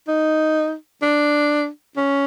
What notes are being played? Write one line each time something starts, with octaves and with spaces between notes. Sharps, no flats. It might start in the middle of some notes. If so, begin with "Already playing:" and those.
D#4
D4
C#4